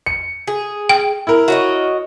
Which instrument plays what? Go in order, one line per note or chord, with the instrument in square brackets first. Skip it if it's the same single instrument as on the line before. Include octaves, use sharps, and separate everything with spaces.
[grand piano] C#7
[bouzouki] G#4
[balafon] G5
[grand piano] E4 A#4
[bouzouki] F#4 C#5 D#5